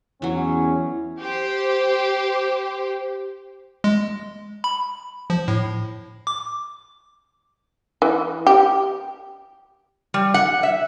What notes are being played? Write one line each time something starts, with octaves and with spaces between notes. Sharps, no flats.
E2 E3 F#3 C#4
G4 C5
G#3
B5
F3
A2
D6
E3
G4
G3
F#5
E5